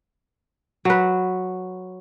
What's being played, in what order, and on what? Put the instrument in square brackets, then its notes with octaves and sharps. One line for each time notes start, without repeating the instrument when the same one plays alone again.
[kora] F#3 B4